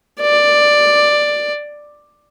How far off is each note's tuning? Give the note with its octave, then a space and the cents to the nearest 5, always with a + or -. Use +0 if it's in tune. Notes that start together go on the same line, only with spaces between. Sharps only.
D5 +5